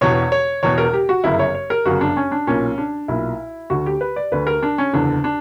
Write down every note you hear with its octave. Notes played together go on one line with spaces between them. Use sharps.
E1 E2 B2 C#5
C#5
E1 E2 B2 C#5
A#4
G4
F#4
G1 F#2 C#3 E4
C#5
C#5
A#4
G1 F#2 C#3 F#4
D4
C#4
D4
B1 A#2 C#4
D4
B1 A#2 E4
D2 D3 F#4
G4
B4
D5
D2 D3 B4
A#4
D4
C#4
F#1 E2 D3 D4
D4